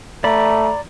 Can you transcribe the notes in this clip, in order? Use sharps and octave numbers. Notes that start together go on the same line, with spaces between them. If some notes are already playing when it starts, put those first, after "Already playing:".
A3 D5 A#5 B5